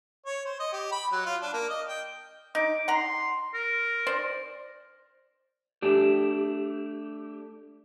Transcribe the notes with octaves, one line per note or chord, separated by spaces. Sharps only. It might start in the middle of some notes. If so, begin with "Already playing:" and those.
C#5
C5
D#5
G4
B5
F#3
F4
D4
A#3
D#5
G5
D#4 D6
F#5 A#5 C6
A#4
C5 D5
A3 D4 G4